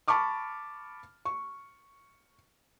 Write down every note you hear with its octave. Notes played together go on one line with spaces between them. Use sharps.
A5 B5 C#6 D6 F6
C#6